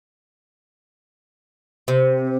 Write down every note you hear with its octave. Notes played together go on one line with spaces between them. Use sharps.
C3